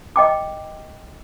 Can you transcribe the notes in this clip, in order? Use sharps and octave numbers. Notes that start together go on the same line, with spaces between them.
D#5 G5 D6